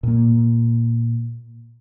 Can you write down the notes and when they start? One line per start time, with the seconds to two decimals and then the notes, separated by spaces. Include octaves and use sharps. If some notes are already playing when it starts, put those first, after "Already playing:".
0.03 A#2 A#3